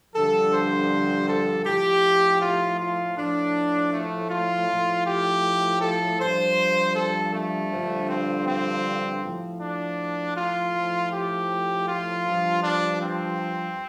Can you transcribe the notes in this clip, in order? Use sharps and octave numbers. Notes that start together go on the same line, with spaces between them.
G2 D3 F3 A4
C5
A4
A2 F3 G4
F4
F4
A2 F3 D4
A3
F4
A2 F3
G4
A4
G2 F3 C5
A4
A3
G2 D3 F3
C4
C4
A2 F3
D4
F4
A2 F3
G4
F4
G2 F3
D4
C4